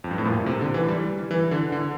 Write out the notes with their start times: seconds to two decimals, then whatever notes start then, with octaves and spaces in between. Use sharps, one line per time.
0.04 F2
0.11 G2
0.18 A2
0.25 A#2
0.46 C3
0.61 D3
0.74 E3
0.88 G3
1.31 E3
1.51 D3
1.72 D3